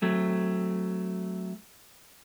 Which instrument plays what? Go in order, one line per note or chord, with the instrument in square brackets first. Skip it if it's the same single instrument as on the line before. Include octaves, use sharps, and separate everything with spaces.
[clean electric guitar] F#3 A3 C4